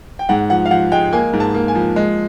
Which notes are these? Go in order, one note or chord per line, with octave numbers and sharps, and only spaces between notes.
G5
G#2 F#5
F3 F#5
F5
F3 F#5
G#3 G5
A#3 G#5
G#2
A5
A#3
G#5
F3
G#3